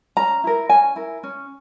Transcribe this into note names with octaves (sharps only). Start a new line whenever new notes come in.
C#4 A#5
E4 A#4
C#4 G#5
E4 A#4
C#4